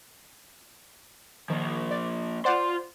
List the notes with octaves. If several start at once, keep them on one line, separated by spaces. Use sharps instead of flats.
D#3 F3 A#3
D5
F4 C5 D5 F#5 C6